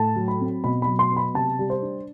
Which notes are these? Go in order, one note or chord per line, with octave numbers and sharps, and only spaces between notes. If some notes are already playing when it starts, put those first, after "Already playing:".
Already playing: A2 A5
F#3
B5
C4
B2 B5
F#3 B5
C6
B3
B5
C3 A5
G3
C5
D4